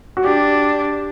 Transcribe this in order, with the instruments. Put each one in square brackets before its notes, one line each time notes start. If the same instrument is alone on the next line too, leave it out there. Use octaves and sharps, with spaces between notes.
[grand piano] F#4
[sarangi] D4 [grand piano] G4